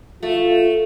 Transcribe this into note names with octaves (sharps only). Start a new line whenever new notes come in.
A3 F4